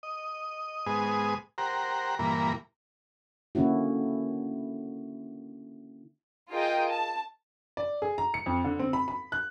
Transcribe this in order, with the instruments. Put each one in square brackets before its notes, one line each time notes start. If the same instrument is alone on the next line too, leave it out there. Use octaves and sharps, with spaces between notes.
[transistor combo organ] D#5
G#2 B3 G#4 D#6
G4 A#4 C5 F#5 A#5
G2 A#2 E3 A#3 A#5 B5
[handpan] D3 A#3 C#4 E4 F#4
[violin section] F4 G#4 A#4 D#5 G5
A5
[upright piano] D5
G#4
A#5
C#7
F2
D3
C4
B5
B5
F#6